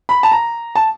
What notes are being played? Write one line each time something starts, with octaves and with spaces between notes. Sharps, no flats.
B5
A5
A#5
A5